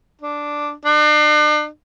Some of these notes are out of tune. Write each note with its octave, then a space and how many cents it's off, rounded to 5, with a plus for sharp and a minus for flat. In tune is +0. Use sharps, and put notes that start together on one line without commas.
D4 +0
D4 +40